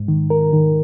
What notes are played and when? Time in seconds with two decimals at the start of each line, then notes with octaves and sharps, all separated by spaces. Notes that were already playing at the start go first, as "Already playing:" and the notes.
Already playing: G#2
0.08 D#3
0.30 A#4
0.53 D#3